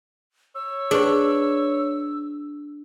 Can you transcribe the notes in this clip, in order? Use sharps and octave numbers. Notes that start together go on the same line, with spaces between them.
C#5 E6
D4 G#4 B4 C#6